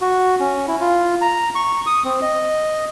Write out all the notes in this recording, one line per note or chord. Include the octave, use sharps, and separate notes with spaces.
F#4
C#4
E4
F4
A#5
C#6
D#6
C4
D#5